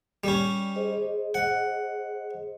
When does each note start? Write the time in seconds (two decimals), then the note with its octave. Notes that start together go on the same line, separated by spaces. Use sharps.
0.24 G3 C#4
0.76 G#4 C5 D#5
1.34 F#5